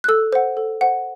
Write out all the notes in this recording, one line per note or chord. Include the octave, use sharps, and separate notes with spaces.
F#6
A4 E6
C5 F#5
A4
C5 F#5